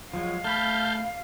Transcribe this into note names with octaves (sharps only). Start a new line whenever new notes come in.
F3 F#3 G#3 F5
A3 A5 B5 F6 G6